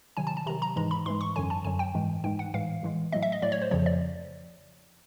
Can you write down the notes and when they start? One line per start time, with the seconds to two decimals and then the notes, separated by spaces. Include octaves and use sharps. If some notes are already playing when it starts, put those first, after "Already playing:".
0.17 C3 D#3 F#3 G#5
0.27 A5
0.37 A5
0.46 C3 D#3 F#3 A#5
0.62 A#5
0.76 G#2 E3 G#3 A#5
0.91 B5
1.06 G#2 E3 G#3 C6
1.21 C#6
1.36 F#2 D3 F#3 G#5
1.50 A5
1.65 F#2 D3 F#3 G#5
1.79 G5
1.95 G#2 E3 G#3
2.24 G#2 E3 G#3 G5
2.39 F#5
2.54 A2 E3 G#3 F5
2.83 A2 E3 G#3
3.12 A2 F#3 A3 D#5
3.22 E5
3.32 D#5
3.42 A2 F#3 A3 D5
3.52 C#5
3.62 C5
3.71 F2 C#3 F3 C#5
3.86 D5